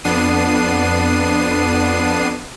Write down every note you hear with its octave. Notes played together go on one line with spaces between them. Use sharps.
F2 B3 D4 C7 D#7